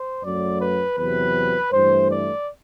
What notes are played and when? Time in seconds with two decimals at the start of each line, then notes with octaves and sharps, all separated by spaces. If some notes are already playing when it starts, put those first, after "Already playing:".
Already playing: C5
0.24 F#2 F#3 A3 D5
0.61 B4
0.97 E2 C3 F#3 B4
1.71 G2 E3 A3 C5
2.09 D5